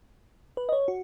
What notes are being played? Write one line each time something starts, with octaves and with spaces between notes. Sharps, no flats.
B4
D#5
C#5
F#4